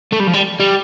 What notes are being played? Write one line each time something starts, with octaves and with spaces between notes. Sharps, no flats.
A3
G3
F3
G3
G3